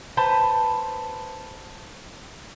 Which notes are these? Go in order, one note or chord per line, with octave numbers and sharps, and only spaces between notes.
B4 C5 A5